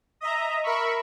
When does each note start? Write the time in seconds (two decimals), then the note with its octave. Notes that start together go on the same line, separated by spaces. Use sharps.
0.21 D#5 E5 A#5
0.64 A#4 E5 B5 C#6